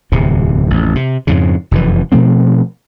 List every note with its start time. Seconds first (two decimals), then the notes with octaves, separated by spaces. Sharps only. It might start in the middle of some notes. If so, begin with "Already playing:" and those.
0.12 D1 E2 C3
0.67 A1 F2
0.95 C3
1.27 F2 G#2 C#3
1.71 F1 F#2 C3 E3
2.12 B2 F3 A3 C4